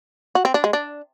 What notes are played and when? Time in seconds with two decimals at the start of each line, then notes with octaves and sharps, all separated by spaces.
0.35 F#4
0.45 C4
0.54 D4
0.64 G#3
0.73 D4